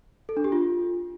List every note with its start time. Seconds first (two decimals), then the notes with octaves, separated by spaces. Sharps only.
0.29 A4
0.37 D4
0.44 G4
0.52 F4